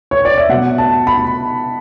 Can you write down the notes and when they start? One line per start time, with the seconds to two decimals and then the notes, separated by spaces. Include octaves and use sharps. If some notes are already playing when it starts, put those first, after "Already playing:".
0.11 C#5
0.25 D5
0.38 E5
0.49 B2 F#3 F#5
0.78 A5
1.07 B5